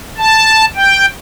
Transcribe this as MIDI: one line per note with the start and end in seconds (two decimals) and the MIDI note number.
0.18 0.65 81
0.75 1.06 79